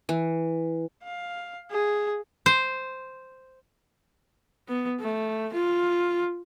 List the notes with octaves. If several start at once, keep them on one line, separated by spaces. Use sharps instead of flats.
E3
F5
G#4
C5
B3
A3
F4